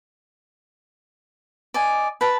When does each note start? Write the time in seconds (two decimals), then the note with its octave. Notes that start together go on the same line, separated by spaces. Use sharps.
1.74 D5 D#5 G#5
2.21 B4 A5